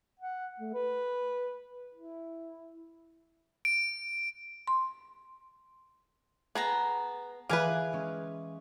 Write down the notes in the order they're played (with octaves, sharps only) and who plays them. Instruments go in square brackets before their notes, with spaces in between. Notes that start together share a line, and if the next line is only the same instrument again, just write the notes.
[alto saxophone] F#5
A3
B4
E4
[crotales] D7
[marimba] C6
[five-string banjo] B3 [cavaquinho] G#4 A5 A#5
[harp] E3 D6 [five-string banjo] G#4 B4 [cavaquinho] F5 G#5
[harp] G#3 C#4